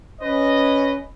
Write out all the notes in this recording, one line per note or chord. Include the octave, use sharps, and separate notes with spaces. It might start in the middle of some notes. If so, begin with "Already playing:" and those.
C#4 B4 D#5